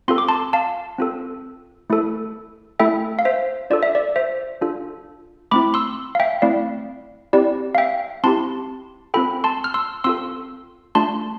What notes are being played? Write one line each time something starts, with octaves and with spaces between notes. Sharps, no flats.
C4 F4 A4 C6
D6
A5 C6
F5 A5
C4 F4 A4
A3 E4 A4
A3 E4 A4 E5 G5
F5
C5 E5
D4 F4 A4 D5
E5
D5
C5 E5
D4 F4 A4
A3 C4 E4 B5 D6
C6 E6
F5
E5 G5
A3 C4 E4 D5 F5
C4 E4 G4 D5
F5
E5 G5
C4 E4 G4 A5 C6
C4 F4 A4 G5 B5
A5 C6
F6
C6 E6
C4 F4 A4 C6 E6
A3 D4 F4 A5 C6